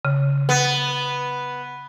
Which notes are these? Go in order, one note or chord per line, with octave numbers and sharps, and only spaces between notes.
C#3
B3